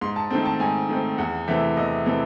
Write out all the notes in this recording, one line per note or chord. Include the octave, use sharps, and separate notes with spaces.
G#2 C6
A5
D#3 A3 C4
A5
G#2 G#5
D#3 A3 C4
E2 F#5
C3 E3 A3 C4 E5
E2 D#5
C3 E3 A3 C4